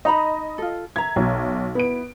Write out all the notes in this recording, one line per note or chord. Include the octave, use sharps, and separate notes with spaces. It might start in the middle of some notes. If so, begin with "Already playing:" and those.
D#4 D#5 A#5 B5
F4 A4
E5 A#5 G#6
B1
B3 E4 D7